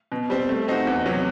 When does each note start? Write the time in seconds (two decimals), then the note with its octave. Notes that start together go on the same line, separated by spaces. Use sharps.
0.12 B2
0.30 G3 C4
0.49 A3
0.68 C4 D#4 F#4
0.87 E2
1.06 C3 F#3